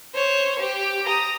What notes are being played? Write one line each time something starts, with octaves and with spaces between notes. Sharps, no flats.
C5 C#5
G4
A#5 D#6